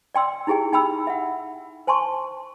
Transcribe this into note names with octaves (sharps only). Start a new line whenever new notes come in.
D5 G5 C6 E6
D#4 E4 G4 G#4 G5
D#4 G5 B5 E6
E5 F#5
C5 G#5 A5 C6 C#6